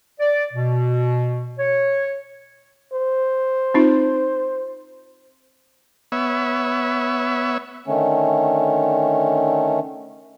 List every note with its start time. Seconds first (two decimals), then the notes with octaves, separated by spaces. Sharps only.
0.19 D5
0.53 B2
1.59 C#5
2.92 C5
3.74 C4 D#4 F4
6.12 B3 C#5 E5
7.87 D3 D#3 A3 C#4